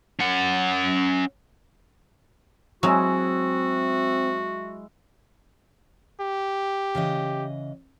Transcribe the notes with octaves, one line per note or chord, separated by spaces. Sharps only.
C#4 F#5
F#3 G#3 C4 E4 F#4
G4
C#3 E3 D#5